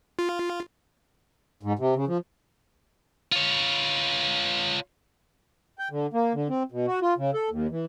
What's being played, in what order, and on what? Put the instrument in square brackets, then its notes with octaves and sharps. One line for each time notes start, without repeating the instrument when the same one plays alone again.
[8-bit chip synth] F4
[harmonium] G#2
C3
C#3
F3
[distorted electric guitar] F4 C#5
[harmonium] G5
D3
A#3
D3
C4
B2
F#4
F4
C#3
A4
D#2
E3